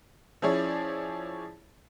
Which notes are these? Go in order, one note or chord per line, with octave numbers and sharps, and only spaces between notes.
F3 C#4 E4 G#4 C#5 D5